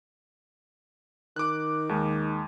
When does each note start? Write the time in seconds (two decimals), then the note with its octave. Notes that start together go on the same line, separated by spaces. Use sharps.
1.36 D#3 D6 F#6
1.89 D#2 G#3